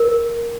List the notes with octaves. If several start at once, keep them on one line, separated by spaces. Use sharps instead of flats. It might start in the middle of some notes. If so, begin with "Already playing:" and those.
Already playing: A#4